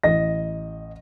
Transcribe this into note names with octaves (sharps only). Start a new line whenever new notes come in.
A1 D#5 A#6